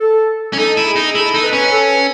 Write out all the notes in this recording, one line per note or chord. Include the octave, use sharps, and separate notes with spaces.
A4
C#4
D#4 A4
E4
G#4
D#4
E4 A4
D#4
B4
C#4
A4